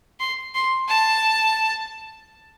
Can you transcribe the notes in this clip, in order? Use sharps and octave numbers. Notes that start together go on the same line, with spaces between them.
C6
C6
A5